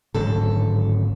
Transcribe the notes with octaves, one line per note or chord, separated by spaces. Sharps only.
D1 G#1 F#2 A4